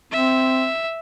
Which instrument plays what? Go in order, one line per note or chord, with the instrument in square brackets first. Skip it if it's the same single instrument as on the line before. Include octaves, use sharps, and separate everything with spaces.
[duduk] C4 [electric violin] E5